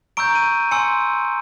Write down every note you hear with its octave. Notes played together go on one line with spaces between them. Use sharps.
A#5 C#6 E6 G6 D7
D#7
G#5 C6 E6 C#7